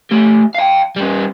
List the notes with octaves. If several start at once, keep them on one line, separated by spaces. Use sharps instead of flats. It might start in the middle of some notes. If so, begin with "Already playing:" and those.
A3 G4
F5 G5
G3 C#4